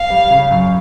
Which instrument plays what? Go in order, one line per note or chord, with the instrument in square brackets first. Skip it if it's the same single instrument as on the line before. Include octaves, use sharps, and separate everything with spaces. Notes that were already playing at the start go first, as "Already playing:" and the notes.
Already playing: [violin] F5
[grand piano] G3
C#3
F#2